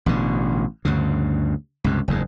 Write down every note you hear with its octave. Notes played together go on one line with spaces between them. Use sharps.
A1 B2 D3
D2 G2 C#3
C#2 G2 C3
F#1 E2 G#2